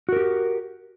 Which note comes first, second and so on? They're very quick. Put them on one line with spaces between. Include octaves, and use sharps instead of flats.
F#4 A#4 G4